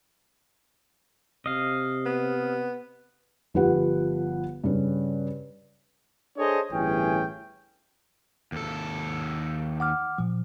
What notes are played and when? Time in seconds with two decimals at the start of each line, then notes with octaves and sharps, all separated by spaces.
1.46 C3 D#5 F5
2.05 B3
3.54 G1 F3 F4 G4 B4 F#5
4.64 G2 C#3 C#4
6.37 D4 G#4 A4 C5 C#5 D#5
6.71 G1 A2 E3 C#4 G#4 G5
8.52 D#2 A4
9.80 F#5 D6 F6
10.18 A#2 F3